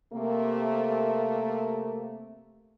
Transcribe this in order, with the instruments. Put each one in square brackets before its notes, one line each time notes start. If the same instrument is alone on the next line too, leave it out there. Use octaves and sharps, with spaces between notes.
[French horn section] C3 A3 A#3